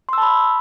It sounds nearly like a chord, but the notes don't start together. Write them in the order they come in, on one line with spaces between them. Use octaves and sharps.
C6 E6 A5 B5